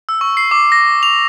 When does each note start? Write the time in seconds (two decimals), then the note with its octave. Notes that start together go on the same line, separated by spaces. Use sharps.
0.09 E6
0.21 C#6
0.37 C7
0.51 D6
0.72 A#6
1.03 F7